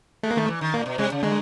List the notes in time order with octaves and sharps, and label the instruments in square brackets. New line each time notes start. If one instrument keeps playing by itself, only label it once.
[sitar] G#3 [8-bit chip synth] A3
[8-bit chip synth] A#3
[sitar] D#3 [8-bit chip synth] A3
[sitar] E3
D#3
[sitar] A#2 [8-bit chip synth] A#3
[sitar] B2
[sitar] C3 [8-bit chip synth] G#3
[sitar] C#3
[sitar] D3 [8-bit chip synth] G#3